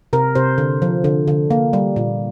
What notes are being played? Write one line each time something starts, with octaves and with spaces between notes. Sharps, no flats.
C3 A#4
C3 C5
D3
F3
D3
D3
A#3
G3
A#2